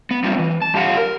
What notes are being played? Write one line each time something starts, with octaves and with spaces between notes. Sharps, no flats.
B3
G3 B3 C4 D#4 F4
E3
A5
G2 G4 F5 F#5
A#4